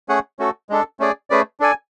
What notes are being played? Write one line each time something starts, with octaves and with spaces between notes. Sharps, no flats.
A3 C#4 G#4 C#5 F#5
A3 C#4 F#4 A4
G#3 D4 A4
A3 C#4 G#4 D5
A3 C#4 G#4 B4 D5
D4 A4 D5 G#5